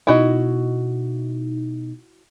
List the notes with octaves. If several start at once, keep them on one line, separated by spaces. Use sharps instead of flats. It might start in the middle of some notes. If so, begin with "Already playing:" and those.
B2 D#4 E4 F#4 D#5